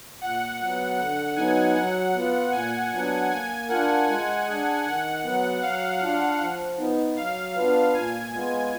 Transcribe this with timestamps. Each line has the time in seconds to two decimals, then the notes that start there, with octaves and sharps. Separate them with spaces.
0.21 A#2 F#5
0.60 F#3 B3
0.98 D3 F#5
1.36 F#3 B3 D#4 G#5
1.75 F#3 F#5
2.14 B3 F4
2.52 A#2 G#5
2.92 F#3 B3 D4
3.30 A#3 G#5
3.69 D4 F4 A#4 F#5
4.07 G#3 G#5
4.46 D4 G#4
4.85 D#3 F#5
5.23 F#3 B3
5.62 F#3 F5
6.01 D4 F4
6.40 F3
6.78 B3 D#4
7.17 F#3 F5
7.56 B3 D4 F4 B4
7.94 A#2 G#5
8.33 G#3 B3 F4